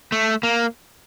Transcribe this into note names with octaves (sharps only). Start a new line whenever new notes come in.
A3
A#3